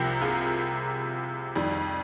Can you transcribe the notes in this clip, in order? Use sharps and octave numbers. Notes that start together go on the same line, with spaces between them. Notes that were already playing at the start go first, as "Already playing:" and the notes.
Already playing: C2 C3 F3 G4 A#4
F4 G#4
F2 D#3 G3